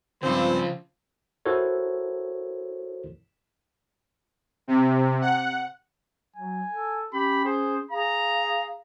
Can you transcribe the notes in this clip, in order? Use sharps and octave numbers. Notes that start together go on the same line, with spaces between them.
G2 C#3 F3 C4 F4 C5
E4 F#4 A4 A#4 C5 C#5
C3
F#5
F#3 G#5
A4
C#4 G4 B5
G#4 C5
G#4 F5 A#5